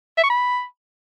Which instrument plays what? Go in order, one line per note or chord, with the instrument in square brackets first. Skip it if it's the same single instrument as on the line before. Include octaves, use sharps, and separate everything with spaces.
[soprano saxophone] E5
C#6
B5